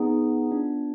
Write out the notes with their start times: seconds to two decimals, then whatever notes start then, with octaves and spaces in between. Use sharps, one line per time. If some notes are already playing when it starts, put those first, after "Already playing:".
Already playing: B3 D#4 G#4
0.51 B3 D4 F4